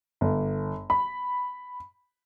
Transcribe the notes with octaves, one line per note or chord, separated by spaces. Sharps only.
G1
B5